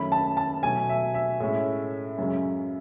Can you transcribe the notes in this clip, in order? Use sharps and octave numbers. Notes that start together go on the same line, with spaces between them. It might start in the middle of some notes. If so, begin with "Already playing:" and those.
Already playing: F#2 D#3 A3 C#4 B5
A5
A5
B2 F#3 A3 G#5
E5
E5
A2 G#3 C#4
F#2 C#3 G#3